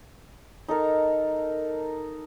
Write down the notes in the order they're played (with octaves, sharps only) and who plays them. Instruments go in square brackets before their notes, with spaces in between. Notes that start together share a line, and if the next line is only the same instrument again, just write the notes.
[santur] D#4 A4 A#4